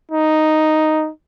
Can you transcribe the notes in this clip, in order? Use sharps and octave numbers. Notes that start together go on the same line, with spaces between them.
D#4